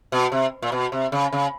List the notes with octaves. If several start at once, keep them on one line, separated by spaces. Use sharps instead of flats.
B2
C3
A#2
B2
C3
C#3
C#3